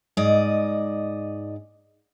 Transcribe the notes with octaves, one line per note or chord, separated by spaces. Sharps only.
G#2 D5 D#5